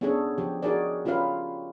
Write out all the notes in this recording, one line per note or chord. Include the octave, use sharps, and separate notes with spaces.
B3 C#4 D4 G#4 A4 C#5
F3 G4
D#4 F#4 G#4 A#4 C#5 D5
C#4 F4 G4 A#4 B4 F5